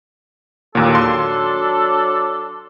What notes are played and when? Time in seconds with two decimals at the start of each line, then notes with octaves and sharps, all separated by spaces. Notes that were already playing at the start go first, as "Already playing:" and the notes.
0.75 D#2 A#2 F#3 D4 A4
0.95 C6